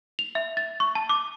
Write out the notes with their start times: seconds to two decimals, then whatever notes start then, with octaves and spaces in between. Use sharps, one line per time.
0.19 F7
0.35 E5
0.57 A6
0.80 C#6
0.95 A5
1.09 D6